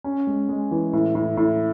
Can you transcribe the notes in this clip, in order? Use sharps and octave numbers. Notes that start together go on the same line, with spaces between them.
C#4
G#3
G#3
E3
A2
A2
A2